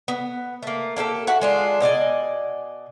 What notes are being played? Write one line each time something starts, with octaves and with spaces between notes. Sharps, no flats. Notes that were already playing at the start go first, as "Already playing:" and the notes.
B3
A3 A#3
A#3 D4 G4 A4
F#4 E5 F#5
G#3 D4 F4
B2 D5 D#5 G#5